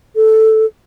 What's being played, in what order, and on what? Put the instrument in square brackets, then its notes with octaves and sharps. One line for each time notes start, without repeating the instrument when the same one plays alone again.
[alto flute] A4